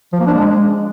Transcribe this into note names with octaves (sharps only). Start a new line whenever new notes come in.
F3
A#3
D4
G#3